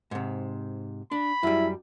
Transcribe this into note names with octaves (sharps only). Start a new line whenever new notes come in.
G#2 C3
D4 B5
F#2 G3 E4